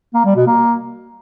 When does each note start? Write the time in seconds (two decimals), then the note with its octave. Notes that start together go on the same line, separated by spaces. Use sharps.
0.14 A#3
0.25 G3
0.36 B2
0.47 A#3